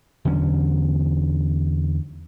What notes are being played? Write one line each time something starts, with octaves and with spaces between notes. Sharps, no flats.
E2 D3 F#3 C#4